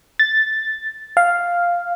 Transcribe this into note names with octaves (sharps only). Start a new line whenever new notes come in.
A6
F5